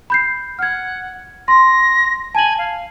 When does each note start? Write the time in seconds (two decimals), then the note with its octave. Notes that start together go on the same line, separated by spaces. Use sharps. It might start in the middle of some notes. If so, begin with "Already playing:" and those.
0.10 B5 G6 C7
0.59 F#5 F6 G#6
1.48 C6 A#6
2.35 G#5 A5 F#7
2.58 F5